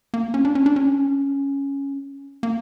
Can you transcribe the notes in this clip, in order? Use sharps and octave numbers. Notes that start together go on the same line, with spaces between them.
A#3
C#4
D4
C#4
D4
C#4
A#3